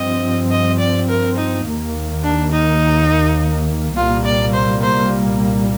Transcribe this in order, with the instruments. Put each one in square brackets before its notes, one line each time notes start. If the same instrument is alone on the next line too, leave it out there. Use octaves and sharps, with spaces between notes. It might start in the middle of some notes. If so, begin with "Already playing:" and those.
Already playing: [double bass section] G2 F3 C4 [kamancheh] D#5
[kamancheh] D#5
D5
A#4
D#4
[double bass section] D#2 D#3 A#3
[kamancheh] D4
D#4
[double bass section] C2 A#2 G3 A#3 [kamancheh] F4
[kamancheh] D5
C5
C5